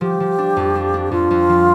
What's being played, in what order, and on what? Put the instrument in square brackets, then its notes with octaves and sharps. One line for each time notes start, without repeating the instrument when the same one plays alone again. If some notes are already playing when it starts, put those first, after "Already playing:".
[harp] F3 [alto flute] G4
[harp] F3
D4
F2
D4
D4
[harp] F2 [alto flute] F4
[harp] F2
F3